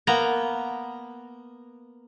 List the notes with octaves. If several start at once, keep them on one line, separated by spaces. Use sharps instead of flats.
A#3 B3 A#5